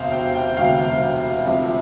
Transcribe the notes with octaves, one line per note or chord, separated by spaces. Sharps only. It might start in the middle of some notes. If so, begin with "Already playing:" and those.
Already playing: E1 D2 C3 C5 F5
G5
G5
E1 D2 C3 F5
F1 F2 C3